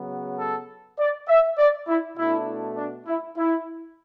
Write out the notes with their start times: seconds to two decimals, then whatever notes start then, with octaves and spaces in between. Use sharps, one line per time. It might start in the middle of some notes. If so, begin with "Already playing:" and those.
Already playing: C#3 F#3 B3
0.39 A4
0.98 D5
1.28 E5
1.58 D5
1.88 E4
2.17 B2 A3 D4 E4
2.77 D4
3.07 E4
3.36 E4